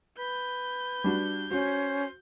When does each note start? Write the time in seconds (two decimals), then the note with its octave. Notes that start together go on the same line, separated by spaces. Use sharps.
0.19 B4 G6
1.04 G3 D4 F#4
1.51 C#4 F#4 C5